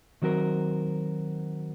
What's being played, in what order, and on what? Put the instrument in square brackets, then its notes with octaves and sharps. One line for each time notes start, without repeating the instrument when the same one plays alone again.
[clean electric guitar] D#3 F#3 C4 F#4 A#4